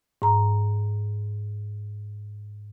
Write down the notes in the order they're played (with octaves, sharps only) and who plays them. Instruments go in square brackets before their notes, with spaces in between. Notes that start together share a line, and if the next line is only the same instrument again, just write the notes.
[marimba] G#2 A#5